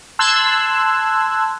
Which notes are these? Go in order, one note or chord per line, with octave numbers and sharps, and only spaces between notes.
A5 C6 E6 F#6 G#6